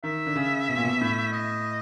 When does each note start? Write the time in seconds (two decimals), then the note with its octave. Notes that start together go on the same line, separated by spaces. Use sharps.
0.04 D#3 E5
0.26 D3
0.36 C#3
0.69 B2
0.77 A#2
0.85 B2
1.01 A2
1.32 D#5